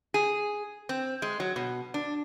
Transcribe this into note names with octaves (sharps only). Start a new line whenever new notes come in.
G#4
C4
G#3
F#3
B2
D4